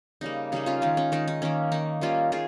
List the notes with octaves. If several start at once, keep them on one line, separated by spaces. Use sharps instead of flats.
C#3 G3 A#3 D#4
C#3 G3 A#3 D#4
C#4 F4
D#3 G#3 D#4
C#4
D#3 G#3 D#4
D#4
D#3 A#3 C#4
D#3 A#3 D#4
D#3 G3 A#3 C#4 F4
D#3 F4 G#4